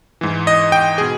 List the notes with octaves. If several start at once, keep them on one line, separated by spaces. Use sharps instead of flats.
G#2 E3
D#5
G5
B2 G#4